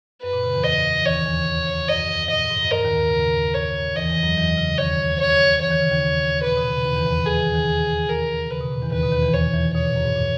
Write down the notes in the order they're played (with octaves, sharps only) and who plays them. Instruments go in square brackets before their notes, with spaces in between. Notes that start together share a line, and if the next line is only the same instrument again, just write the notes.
[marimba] F#2 [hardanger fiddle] B4
[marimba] A#2
C#3
E2 E3
[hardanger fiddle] D#5
[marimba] E3
[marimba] D#2 D#3 [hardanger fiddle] C#5
[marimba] E2 E3
[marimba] F#2 [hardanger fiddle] D#5
[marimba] A#2 [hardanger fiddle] D#5
[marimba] G#2
F#2
[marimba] G#2 [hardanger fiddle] A#4
[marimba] D#2 D#3
D#3
C#3
D#2 D#3
[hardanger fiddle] C#5
[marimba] E2 E3 [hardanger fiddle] D#5
[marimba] E2 E3
F#2 F#3
E2 E3
C#3
[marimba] D#2 D#3 [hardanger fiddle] C#5
[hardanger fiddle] C#5
[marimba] E3 [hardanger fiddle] C#5
[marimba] D#3
C#3
D#2 D#3
[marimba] A#2 [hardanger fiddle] B4
[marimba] B2
C#3
D#2 D#3
E2 E3
E2 E3
E2 E3
[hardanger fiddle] G#4
[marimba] E3
D#2 D#3
D#2 D#3
[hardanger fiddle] A#4
[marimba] C#3 [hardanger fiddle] B4
[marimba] B2
A#2
E2 E3
[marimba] D#2 D#3 [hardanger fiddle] B4
[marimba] B2
D#2 D#3
E2 E3
[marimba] E2 E3 [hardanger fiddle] C#5
[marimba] E2 E3
[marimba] B2 [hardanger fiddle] C#5
[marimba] A#2
F#2
G#2
A#2